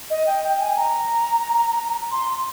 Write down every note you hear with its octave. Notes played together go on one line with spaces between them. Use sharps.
D#5
G5
G5
G#5
A#5
C6